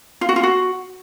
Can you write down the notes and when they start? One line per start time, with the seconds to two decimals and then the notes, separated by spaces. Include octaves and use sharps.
0.21 F4
0.29 F#4
0.36 F4
0.43 F#4